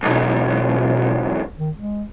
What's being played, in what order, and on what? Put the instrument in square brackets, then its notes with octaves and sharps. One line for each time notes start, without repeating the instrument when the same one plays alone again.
[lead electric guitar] B1 G#2 [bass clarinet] B2
[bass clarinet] D#3
G#3